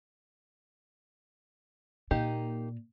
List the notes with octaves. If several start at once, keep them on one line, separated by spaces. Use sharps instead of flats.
A#2 A#3 D#4 G4